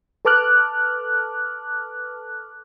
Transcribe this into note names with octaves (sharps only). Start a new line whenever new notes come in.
A4 B4 A5 D6 F6 F#6